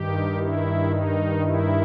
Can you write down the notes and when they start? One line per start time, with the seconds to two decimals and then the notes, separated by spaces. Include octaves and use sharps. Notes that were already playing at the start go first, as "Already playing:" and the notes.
Already playing: G2 D#3 G4
0.36 E4
0.89 D#4
1.41 E4